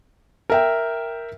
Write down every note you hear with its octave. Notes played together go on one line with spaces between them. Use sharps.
A#4 E5 G5